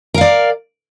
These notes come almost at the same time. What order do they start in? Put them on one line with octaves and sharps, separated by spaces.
A#4 F5 D5